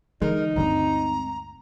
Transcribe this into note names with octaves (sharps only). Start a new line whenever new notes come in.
D3 E3 G#3 D#4 A#4
D2 G2 D3 G#3 C4 A#5